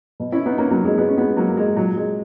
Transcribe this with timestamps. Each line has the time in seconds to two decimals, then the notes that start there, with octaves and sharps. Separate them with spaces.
0.20 B2
0.32 C#4 E4
0.46 B3 D#4
0.58 A#3 C#4
0.71 F#3 A#3
0.85 G#3
0.97 G#3 B3
1.08 C#4
1.17 G#3 B3
1.37 F#3 A#3
1.57 G#3
1.76 A#2 F#3
1.96 G#3